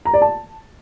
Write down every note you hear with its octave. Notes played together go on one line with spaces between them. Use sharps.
A#5
D5
A5